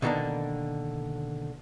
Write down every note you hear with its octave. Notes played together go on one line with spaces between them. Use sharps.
B2 D3 D#3 G3 A#3 D4